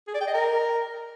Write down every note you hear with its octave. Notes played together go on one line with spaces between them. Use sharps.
G#4
D5
G5
D#5
A#4